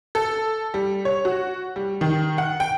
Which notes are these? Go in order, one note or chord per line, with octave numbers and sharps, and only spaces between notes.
A4
G3
C#5
F#4
G3
D#3
F#5
G5